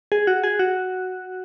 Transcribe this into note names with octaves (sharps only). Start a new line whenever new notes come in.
G#4
F#4
G#4
F#4